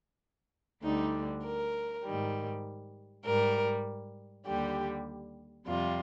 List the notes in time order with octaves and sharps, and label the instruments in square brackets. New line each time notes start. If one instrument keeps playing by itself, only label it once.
[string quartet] D2 D3 G3 D#4
A#4
G#2 D#3 G3
G#2 G3 A#4
D#2 D3 G3 G4
F2 C3 G3 F4